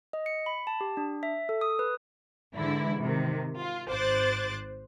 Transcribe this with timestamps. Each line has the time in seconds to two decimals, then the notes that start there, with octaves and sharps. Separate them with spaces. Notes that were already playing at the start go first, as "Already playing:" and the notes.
0.13 D#5
0.26 C#7
0.46 B5
0.67 A5
0.81 G4
0.97 D4
1.23 E5
1.49 A4
1.61 D#6
1.79 B4
2.55 G#2 D3 E3 E4
2.99 C3 D#3
3.58 F4
3.89 G#1 C5 D6 F#6 A6